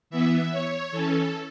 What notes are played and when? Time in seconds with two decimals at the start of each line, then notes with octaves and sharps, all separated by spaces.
0.10 E3 B3 E5
0.51 C#5
0.91 E3 C#4 A4